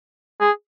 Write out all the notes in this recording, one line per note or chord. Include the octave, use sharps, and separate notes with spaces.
G#4